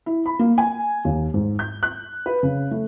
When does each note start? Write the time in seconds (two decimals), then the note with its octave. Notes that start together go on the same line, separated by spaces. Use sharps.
0.06 E4
0.26 B5
0.39 A#3
0.58 G#5
1.05 D#2
1.34 G#2
1.59 G6
1.83 F#6
2.26 B4
2.43 C#3
2.71 A3